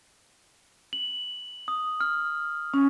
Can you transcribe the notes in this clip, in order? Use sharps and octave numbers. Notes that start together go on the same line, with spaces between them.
F#7
D#6
F6
C#4